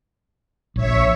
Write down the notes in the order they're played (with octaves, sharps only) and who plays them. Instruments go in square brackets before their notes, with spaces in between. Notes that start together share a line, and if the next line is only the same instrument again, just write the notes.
[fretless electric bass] A#1 [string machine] C#5 E5 C#6